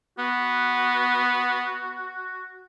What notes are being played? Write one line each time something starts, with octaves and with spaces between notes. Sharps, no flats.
B3 F#4